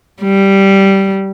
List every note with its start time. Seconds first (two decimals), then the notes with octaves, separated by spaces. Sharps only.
0.22 G3